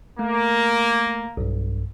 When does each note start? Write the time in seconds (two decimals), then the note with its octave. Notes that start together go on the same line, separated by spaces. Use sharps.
0.19 A3 A#3
1.37 B1 G2